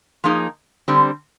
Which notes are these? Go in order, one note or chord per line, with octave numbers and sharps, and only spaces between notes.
F3 A#3 D#4 G#4
D3 G3 C4